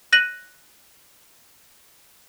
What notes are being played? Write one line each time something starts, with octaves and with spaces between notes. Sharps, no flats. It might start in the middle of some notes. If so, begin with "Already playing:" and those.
F#6 A#6 D#7 F#7